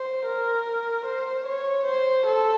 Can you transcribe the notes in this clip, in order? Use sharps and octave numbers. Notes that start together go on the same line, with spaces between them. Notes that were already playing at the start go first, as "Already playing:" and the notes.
Already playing: C5
A#4
C5
C#5
C5
A4